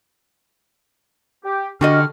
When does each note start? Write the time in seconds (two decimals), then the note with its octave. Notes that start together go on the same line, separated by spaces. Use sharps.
1.45 G4
1.81 D3 D4 F#4 G4 D#5 C#6 F6